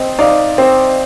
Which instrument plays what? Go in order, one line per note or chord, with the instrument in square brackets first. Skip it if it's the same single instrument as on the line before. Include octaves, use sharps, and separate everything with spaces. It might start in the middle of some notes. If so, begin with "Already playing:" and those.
Already playing: [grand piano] C4 [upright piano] C5 D#5
[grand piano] D#4 [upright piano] D5 F5
[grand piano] C4